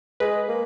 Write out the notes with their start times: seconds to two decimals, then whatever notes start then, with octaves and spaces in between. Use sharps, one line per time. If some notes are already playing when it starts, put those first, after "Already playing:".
0.20 G#3 B4
0.48 A#3